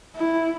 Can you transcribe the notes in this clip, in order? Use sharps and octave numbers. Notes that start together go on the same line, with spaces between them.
E4